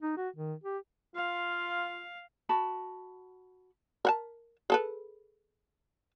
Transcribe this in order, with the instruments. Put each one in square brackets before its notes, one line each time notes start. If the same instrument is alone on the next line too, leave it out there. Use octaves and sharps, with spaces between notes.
[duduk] D#4
F#4
D#3
G4
[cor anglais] F4 [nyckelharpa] F5
[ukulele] F#4 A5 B5
[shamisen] A#4 F#5 A5
G#4 A4 B4